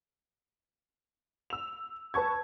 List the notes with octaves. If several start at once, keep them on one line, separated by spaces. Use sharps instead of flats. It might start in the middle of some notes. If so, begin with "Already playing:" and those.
E6 F7
B4 A5 C#6 G#6